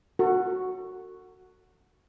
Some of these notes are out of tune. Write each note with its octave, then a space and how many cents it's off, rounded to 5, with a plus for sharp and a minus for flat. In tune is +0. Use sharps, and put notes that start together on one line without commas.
F#4 +0 A4 +35